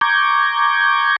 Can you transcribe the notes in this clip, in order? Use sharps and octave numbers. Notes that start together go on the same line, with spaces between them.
A#5 C#6 D6 G6 G#6